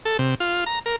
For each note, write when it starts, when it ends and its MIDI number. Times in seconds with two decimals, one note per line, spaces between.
0.05 0.17 69
0.19 0.35 48
0.40 0.64 65
0.66 0.79 82
0.86 0.96 70